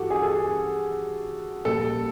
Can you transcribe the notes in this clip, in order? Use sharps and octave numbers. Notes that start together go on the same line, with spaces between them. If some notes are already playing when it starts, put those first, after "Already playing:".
Already playing: G2 E3 F#4 G4 A4
G#4
A4
G#4
A#1 A#2 G3 A4